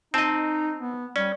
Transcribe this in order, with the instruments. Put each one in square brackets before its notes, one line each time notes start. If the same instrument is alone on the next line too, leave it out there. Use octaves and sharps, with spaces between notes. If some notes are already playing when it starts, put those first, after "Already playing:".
[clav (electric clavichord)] C4 D#5 [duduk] D#4 [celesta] A5 E7
[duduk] B3
[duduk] G3 [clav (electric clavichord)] C#4 [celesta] D5